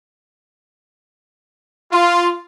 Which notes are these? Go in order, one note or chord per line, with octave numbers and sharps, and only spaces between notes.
F4